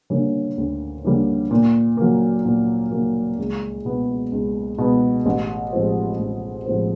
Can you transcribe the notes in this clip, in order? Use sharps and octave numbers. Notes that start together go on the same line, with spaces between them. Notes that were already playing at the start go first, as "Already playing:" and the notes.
D3 G3 A#3 C#4
D2
D3 G3 A#3 C#4
A#2
F#3 A#3
A#2
F#3 A#3
C#2
B2 G#3 B3
C#2
B2 G#3 B3
A1
A2 F3 G#3 C4
A1
A2 F3 G#3 C4